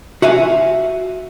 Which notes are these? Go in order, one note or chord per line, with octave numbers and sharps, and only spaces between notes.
F#4 E5 F5 G#5